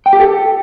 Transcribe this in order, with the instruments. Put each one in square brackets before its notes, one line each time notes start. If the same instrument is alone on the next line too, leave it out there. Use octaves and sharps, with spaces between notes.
[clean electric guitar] G5
G4
A4